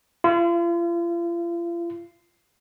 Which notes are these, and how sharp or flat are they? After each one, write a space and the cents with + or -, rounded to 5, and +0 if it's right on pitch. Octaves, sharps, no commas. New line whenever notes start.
F4 -40